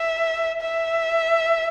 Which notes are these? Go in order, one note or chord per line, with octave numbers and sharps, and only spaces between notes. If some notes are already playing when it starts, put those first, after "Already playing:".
Already playing: E5
E5